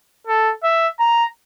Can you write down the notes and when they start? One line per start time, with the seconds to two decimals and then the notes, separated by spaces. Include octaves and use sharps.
0.28 A4
0.64 E5
1.00 A#5